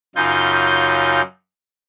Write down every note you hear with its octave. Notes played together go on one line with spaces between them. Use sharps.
F#2 C#3 D#4 F4 G6